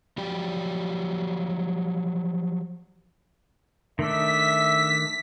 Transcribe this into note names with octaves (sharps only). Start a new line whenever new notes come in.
F3 F#3 G4 D5 G5
D#3 A3 D4 E5 B6